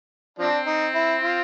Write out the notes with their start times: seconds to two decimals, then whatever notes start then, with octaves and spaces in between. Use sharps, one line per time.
0.39 F3 C4 D4
0.67 D#4
0.95 E4
1.23 F4